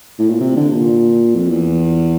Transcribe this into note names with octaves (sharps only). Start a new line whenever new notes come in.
A2
A#2
C3
D3
A#2
F2
E2